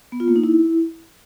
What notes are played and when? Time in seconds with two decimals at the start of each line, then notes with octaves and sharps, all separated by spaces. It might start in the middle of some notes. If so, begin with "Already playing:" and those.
0.12 B3
0.20 F4
0.28 A#3
0.36 D#4
0.44 E4